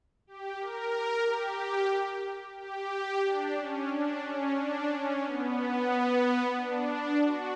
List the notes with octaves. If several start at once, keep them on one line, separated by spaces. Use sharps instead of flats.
G4
A#4
G4
G4
D4
C#4
D4
C#4
D4
C#4
B3
D4
F#4